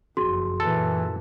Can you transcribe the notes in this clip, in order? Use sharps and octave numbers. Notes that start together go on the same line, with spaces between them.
F#1 F2 F#4 G#4 C6
F#2 A#2 E3 A4